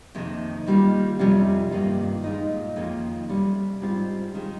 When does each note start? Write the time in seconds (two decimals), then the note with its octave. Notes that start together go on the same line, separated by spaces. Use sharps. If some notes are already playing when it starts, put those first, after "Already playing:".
0.15 F2 C3 D#3 A#3
0.66 D#3 G3 A#3 F4
1.19 F2 C3 G3 C#4 F4
1.71 G2 D#3 A#3 F4
2.24 A#2 G#3 D#4
2.76 F2 D#3 A#3 C#4 F4
3.28 C3 G3 C#4
3.81 G#2 G3 C4 F4
4.33 D#3 G#3 C#4